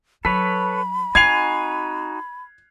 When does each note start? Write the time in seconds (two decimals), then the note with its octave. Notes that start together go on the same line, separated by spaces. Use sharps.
0.25 F#3 A4 B4 C#5 B5 B6
1.15 C4 D#4 F#4 G#5 G#6 C7 F7